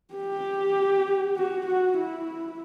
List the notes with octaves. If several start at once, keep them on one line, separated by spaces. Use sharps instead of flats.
G4
F#4
F#4
E4